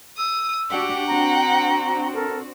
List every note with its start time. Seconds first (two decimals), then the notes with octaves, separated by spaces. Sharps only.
0.17 D#6 E6
0.70 D4 F#4 G4 F#5 G5
1.07 C4 D4 F#4 A#5
2.13 A4 A#4